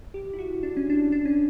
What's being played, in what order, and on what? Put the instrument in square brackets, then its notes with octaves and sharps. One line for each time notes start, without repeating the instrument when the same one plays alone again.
[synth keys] G4
E4
F#4
D4
C#4
D4
D4
C#4